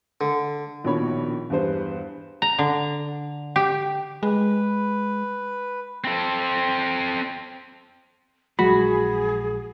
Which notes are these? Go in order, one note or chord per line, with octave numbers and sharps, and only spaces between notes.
D3
A#1 B2 D#3 F3 C#5 B5
E2 G2 B3 C5
A#5
D3
G4
G#3 B4
C4 A4
A#1 F#3 G#3 F#4 G#4 B5